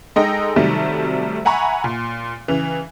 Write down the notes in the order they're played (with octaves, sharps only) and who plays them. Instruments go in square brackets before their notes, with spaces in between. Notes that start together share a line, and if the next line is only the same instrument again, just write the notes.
[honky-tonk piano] G#3 D#4 A4 D#5 G5 A#6
C3 D#3 F#3 G3 A3
E5 F#5 G#5 A#5 B5 C#6
A#2
C#3 E3